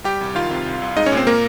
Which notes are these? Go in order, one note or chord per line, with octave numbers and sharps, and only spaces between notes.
G3 G4 G5
C2
D#3 F4 F5
C3
C2
C2
G#3 D#4 D#5
C#4 C#5
A#2
C4 C5
A#3 A#4